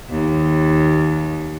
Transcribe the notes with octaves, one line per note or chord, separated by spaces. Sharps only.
D#2